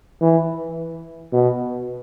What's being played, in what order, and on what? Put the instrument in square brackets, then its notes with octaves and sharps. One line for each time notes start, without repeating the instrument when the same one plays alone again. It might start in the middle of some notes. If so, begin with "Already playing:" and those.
[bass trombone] E3
B2